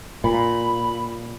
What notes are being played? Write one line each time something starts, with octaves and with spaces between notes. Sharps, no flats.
A#2 B5